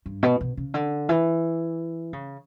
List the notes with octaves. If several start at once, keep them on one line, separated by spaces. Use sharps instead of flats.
G2
B2
B2
C#3
D3
E3
C#3